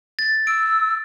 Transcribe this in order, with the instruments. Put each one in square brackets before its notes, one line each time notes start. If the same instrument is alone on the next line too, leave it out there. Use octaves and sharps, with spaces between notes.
[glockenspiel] A6
[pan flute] E6 [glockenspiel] D7